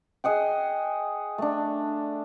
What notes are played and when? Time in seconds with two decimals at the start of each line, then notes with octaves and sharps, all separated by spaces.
0.24 G#4 D#5 F#5 G5
1.38 A3 D4